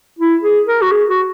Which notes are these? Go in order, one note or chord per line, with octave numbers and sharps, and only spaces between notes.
E4
G#4
A#4
F#4
G#4
F#4